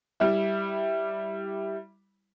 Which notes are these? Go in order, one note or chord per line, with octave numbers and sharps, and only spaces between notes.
G3 E4